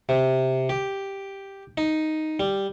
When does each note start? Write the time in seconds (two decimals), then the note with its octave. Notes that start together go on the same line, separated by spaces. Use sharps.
0.09 C3
0.69 G4
1.78 D#4
2.40 G3